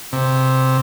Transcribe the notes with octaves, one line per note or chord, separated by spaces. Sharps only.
C3